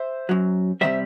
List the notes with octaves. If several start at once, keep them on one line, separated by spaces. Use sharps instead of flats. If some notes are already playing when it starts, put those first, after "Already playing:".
Already playing: C5 E5
F#2 F#3
C3 D#3 G3 C5 E5